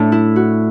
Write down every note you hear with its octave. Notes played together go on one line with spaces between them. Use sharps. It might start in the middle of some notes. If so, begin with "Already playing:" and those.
Already playing: A2 A3 D4
E4
F#4